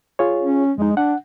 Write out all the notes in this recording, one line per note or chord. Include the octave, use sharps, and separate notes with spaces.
F4 G#4 C#5
C#4
F2 G#3 D#4
D4 F#5